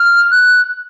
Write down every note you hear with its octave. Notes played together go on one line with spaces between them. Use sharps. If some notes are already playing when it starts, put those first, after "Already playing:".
Already playing: F6
F#6